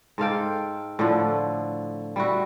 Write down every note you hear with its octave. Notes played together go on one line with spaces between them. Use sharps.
G#2 A4 F5 G5
A2 D3 F3
G3 E4 F#4